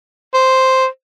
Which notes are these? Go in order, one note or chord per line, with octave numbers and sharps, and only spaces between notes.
C5